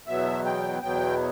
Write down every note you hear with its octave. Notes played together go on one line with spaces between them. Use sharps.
E2 B2 F#3 B3 E5
G5
E2 B2 F#3 B3 G5